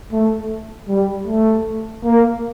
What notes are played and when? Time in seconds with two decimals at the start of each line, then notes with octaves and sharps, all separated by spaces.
0.12 A3
0.88 G3
1.27 A3
2.04 A#3